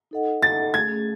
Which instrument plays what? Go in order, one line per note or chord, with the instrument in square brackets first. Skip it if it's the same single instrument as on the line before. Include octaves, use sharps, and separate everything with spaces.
[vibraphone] D#4 A4 D#5 F#5
[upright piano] A6
[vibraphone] A3 C#4 G#4 [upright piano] G#6